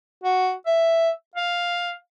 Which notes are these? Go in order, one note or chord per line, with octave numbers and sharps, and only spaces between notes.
F#4
E5
F5